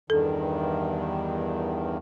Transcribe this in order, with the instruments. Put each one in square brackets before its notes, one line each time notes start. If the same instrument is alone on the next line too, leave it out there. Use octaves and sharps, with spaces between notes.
[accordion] E2 G2 D#3 [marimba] A4